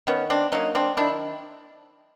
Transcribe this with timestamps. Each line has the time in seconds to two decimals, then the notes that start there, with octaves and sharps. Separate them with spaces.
0.07 D#3 B3 C#4
0.30 C4 D4
0.52 F#3 A#3 C#4 D#4
0.75 C4 D4
0.97 D#3 D4 E4